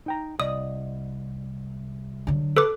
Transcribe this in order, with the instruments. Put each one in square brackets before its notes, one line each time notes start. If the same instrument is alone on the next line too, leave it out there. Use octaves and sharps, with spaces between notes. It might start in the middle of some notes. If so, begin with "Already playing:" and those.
[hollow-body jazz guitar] D#4 G5 A#5
[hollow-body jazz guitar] C2 D5 D#5 [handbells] D#6
[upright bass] D3 F#3
[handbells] A4 B4 D6